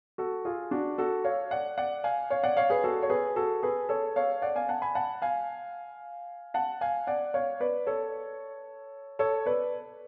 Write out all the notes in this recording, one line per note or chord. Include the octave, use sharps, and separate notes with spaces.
F#4 A4
F4 G#4
D4 F#4
F#4 A4
C#5 F5
D5 F#5
D5 F#5
F5 G#5
C#5 F5
D5 F#5
C#5 F5
G#4 B4
F#4 A4
C#5
G#4 B4
F#4 A4
G#4 B4
A4 C#5
C#5 F5
D5 F#5
F5 G#5
F#5 A5
G#5 B5
F#5 A5
F5 G#5
F#5 A5
F5 G#5
D5 F#5
C#5 F5
B4 D5
A4 C#5
A4 C#5
B4 D5